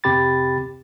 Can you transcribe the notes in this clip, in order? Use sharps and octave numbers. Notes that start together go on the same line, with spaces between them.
F2 C3 C4 G4 B5 A6